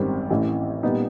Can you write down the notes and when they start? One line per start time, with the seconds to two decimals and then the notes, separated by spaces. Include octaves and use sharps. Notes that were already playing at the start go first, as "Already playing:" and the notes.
Already playing: G#1 F#2 D#3 G3 C4
0.30 A1 A2 E3
0.83 A#2 G3 B3 D#4